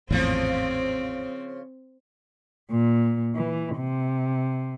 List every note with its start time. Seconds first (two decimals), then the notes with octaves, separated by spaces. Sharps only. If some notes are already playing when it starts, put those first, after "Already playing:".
0.10 G#1 E2 A2 C#3 F3 C4
2.71 A#2
3.35 E3
3.76 C3